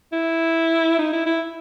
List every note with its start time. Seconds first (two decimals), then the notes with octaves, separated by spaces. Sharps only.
0.12 E4
0.99 D#4
1.13 E4
1.26 E4